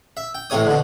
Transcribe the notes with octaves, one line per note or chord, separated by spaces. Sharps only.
E5
G5
A1 A2 C3 C#5 D#6
B2 D3